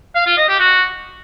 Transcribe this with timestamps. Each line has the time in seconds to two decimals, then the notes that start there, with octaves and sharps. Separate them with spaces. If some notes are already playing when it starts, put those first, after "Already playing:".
0.15 F5
0.26 F4
0.37 D#5
0.49 G4
0.60 F#4